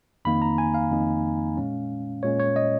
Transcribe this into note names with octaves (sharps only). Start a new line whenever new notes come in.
F2 D#3 A#3 D#4 B5
A#5
G#5
F5
F2 D#3 A#3 D#4
A#2 G#3 C#4
A#2 G#3 C#4 C#5
C#5
D#5